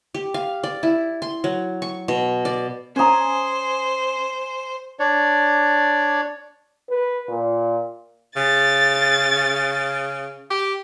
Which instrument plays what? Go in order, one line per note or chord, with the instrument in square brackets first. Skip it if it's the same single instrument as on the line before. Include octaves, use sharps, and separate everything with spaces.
[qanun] G4
F5
D5
E4
C6
F#3
C#6
B2
D5
[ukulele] C#4 A#5 [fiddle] C5 [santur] G#5 D#6
[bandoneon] D4 C#5 D5
[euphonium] B4
A#2
[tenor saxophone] C#3 [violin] A6
[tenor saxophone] G4